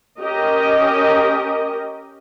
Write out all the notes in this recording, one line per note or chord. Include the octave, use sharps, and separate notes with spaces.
C#4 G4 A#4 D#5